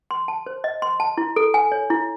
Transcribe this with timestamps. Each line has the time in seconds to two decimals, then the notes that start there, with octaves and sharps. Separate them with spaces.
0.11 C6
0.28 A5
0.46 C5
0.64 D#5
0.82 C6
1.00 A5
1.17 E4
1.36 A4
1.54 G#5
1.72 C#5
1.90 E4